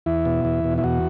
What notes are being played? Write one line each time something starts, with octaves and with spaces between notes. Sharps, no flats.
E2 E4
B2
E2
B2
E4
E2 F#4